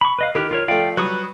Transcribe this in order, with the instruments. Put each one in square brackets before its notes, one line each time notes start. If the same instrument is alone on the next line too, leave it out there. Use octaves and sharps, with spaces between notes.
[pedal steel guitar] B5 C#6
B4 D#5 F5
[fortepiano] D#3 F#6 [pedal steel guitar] E4 G4 A#4
[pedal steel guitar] F4 A#4 C#5
[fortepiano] F3 A3 [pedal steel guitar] D5 F5 G5
[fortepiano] F#3 G3 [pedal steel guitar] B4 C#6 D#6